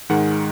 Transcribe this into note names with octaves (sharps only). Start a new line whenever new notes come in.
G#2 D#3 G#3 F#5